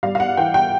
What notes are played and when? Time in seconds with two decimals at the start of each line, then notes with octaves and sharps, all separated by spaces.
0.03 G3 F5
0.15 F5
0.20 F#5
0.37 E3 G5
0.54 G5